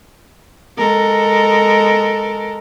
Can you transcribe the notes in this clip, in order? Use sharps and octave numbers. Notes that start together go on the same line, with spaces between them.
G#3 A4 A#4